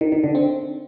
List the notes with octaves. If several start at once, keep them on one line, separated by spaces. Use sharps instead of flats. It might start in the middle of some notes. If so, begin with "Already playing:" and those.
D#3
D#3
D3
C4